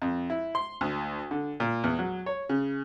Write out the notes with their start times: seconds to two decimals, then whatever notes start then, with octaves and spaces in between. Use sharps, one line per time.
0.02 F2
0.30 E4
0.55 C6
0.81 D2
1.31 D3
1.60 A#2
1.84 E2
1.99 F#3
2.26 C#5
2.49 C#3